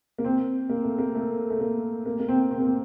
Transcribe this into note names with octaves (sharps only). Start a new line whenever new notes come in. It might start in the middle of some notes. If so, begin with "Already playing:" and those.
A#3
C4
A#3
A3
A#3
A3
A3
A#3
A#3
A#3
C4
C4
A#3
C4